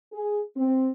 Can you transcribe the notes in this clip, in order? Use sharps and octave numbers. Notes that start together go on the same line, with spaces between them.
G#4
C4